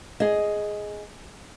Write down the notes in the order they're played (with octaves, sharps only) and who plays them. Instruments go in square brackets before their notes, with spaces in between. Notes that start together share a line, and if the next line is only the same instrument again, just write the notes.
[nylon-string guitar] G#4 D#5